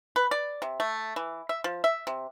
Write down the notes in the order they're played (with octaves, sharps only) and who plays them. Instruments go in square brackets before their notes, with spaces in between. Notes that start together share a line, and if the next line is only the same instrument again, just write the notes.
[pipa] B4
D5
C3
A3
E3
E5
F3
E5
C3